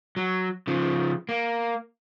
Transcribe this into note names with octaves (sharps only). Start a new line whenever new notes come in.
F#3
C#3 F3
A#3